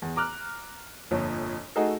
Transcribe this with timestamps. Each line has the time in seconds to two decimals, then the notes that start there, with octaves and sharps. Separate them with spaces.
0.02 E2
0.16 A#5 D6 F6 F#6
1.11 G1 F2 A#2 C#5
1.76 A3 D#4 F#4 G#4 A4